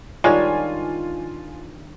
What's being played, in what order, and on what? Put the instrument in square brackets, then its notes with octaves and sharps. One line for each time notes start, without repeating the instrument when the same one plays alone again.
[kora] D#3 G3 D4 [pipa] G#3 C#5 [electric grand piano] F4 G#5